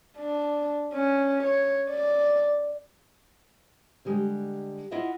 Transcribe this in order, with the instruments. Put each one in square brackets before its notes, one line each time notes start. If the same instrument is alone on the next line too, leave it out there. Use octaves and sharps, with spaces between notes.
[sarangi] D4
C#4
C#5
D5
[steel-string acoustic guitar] D3 G3 G#3 G4
E4 F4 D#5 E5 F#5